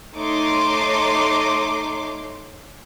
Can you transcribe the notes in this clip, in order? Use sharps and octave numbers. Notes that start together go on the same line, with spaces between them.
A3 D#4 C#5 C6 D6